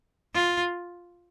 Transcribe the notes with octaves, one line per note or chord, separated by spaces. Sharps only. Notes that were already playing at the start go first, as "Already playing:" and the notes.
F4